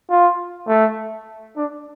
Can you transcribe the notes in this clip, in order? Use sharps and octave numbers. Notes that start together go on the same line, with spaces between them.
F4
A3
D4